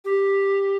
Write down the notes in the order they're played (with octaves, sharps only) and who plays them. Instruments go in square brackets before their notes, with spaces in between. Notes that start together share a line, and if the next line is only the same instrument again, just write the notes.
[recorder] G4